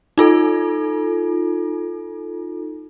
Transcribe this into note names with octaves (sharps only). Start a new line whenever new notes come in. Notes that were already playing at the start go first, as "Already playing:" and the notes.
D#4 F4 A4